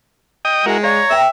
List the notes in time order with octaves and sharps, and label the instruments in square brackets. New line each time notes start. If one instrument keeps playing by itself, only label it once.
[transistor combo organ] D#5 G5 D#6
[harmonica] G#3 [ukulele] E4 G#5 [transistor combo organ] F#4 A#4
[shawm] C#5 [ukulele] D5 F5 [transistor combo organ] A#5
[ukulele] B4 G5 [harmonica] E5